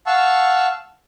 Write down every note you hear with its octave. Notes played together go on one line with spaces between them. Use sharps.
F5 F#5 A5 C#6 E6